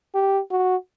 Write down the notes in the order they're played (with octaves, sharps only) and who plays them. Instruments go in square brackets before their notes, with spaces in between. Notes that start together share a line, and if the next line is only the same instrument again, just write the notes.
[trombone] G4
F#4